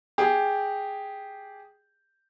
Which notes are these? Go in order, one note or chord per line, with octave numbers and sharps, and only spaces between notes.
G4 G#4